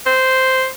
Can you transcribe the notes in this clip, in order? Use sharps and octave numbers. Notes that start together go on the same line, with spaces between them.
C5